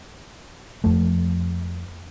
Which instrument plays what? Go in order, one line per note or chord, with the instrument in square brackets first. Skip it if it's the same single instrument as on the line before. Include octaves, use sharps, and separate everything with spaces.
[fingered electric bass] F2 F3 A3